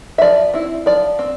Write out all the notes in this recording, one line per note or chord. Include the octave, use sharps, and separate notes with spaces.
E5
F3 D5
C4 E4
F3 D5
C4